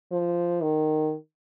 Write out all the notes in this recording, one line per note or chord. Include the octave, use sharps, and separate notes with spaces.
F3
D#3